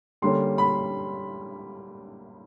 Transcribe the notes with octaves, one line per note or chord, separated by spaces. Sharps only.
D3 G3 A#3 C#4 C6
B5